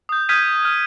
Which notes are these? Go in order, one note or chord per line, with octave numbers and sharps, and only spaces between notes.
D#6 G6
D#6 F6 G6 G#6 B6 D#7
F6